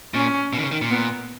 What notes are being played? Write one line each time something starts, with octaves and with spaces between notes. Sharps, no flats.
A#2 C#4
B2
D#3
C#3
D#3
A#2
B3